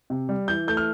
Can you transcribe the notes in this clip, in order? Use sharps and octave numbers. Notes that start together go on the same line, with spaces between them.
C3
G3
E3 G6
A3 G6
F6